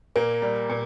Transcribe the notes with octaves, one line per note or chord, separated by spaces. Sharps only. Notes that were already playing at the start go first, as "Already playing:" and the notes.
A#2 A#3
G3
A#2